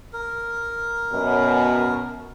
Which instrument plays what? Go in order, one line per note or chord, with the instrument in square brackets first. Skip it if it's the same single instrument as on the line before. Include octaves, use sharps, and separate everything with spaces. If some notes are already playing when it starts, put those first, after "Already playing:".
[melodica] A#4
[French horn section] F#2 B2